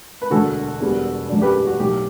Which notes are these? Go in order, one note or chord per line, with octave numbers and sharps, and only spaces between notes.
B4
E1 D2 D3 F#4 A4
E1 E2 B2 G3 B3
F#2 F#3 A3 D4
G4 B4
G4
F#4
B1 A2 F#3 G4